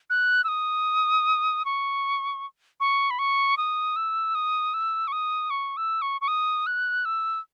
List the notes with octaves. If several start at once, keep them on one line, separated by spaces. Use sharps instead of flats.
F#6
E6
D#6
C#6
C#6
B5
C#6
D#6
E6
D#6
E6
C#6
D#6
C#6
E6
C#6
C#6
D#6
F#6
E6